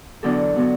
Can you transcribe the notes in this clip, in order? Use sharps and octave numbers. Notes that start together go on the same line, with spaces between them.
E2 D3 F#3 B3 D4 A4
D3 F#3 B3 D4